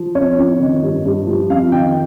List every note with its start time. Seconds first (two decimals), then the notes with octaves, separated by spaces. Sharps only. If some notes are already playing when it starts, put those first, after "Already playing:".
Already playing: F3
0.15 F2 C#5
0.38 F2
0.60 D#3
0.83 G2
1.05 G2
1.27 F3
1.50 F2 F5
1.72 D#3 G5